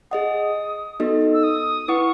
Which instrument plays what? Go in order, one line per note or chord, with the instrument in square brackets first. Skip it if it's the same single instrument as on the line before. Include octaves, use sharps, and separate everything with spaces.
[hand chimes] G#4 D#5 F#5 [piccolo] D#6
[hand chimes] B3 D#4 F#4 A4 D#5
[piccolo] E6
D#6
[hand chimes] E4 B4 F#5 [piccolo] C#6